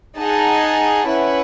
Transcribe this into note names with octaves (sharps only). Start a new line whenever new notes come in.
D#4 G#4 D#5 F#5 A5
C#4 E4 B4 F#5